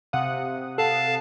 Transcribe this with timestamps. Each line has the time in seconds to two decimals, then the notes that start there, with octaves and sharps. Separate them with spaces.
0.13 C3 F5 F#5 D#6
0.78 A4 F5 A5